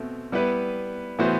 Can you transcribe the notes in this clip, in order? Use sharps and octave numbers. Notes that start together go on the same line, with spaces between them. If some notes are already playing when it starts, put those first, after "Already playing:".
Already playing: B2 A3 C4
G3 B3 E4 B4
A2 E3 B3 F#4 C5